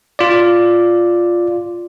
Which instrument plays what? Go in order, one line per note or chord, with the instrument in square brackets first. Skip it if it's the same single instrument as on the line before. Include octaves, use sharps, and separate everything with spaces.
[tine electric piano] F4 D5